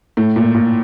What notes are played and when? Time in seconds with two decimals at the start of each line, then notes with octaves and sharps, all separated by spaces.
0.17 A2
0.36 A#2
0.54 A#2